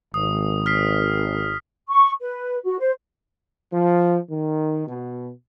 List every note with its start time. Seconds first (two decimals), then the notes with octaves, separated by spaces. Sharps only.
0.14 G#1 D#6
0.66 F6 B6 C7
1.89 C#6
2.21 B4
2.65 F#4
2.79 C5
3.72 F3
4.30 D#3
4.85 B2